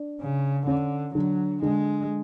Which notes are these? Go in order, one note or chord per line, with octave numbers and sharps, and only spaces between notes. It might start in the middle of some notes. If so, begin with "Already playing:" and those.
Already playing: D4
C#3
D3 C#4
D3 F#3
D3 G#3